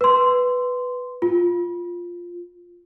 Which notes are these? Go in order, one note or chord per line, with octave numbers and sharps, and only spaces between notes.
B4 C6
F4